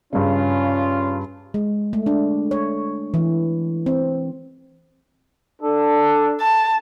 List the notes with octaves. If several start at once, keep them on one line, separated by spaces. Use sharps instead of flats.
G2 C#3 C#4 F4
G#3
A3
D4
C#5
E3
C4
D4 A4
A5